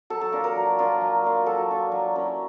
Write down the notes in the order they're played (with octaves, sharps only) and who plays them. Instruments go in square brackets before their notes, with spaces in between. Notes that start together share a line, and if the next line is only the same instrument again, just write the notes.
[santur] F#3 A4
A4
A#3 D4 F4 A#4
A#4
F#3
A#3 D4 F4
F#3
A#3 D4 F4
F#3 A4
A#3 D4 F4
F#3
A#3 C#4 E4